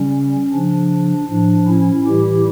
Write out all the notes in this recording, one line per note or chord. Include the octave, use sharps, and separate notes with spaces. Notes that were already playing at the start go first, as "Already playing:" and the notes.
Already playing: C#3 G3 C#4
C#3 F3 D4
A2 F3 D4
C#4 E4
A2 E3 G3 E4 G4